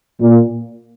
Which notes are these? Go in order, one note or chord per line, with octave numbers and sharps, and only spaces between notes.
A#2